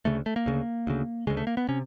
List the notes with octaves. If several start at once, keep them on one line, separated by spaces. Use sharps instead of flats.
D2 C#3 A3
A3
A#3
D2 C#3
D2 C#3
D2 C#3 G#3
A3
A#3
B3
C3 C#4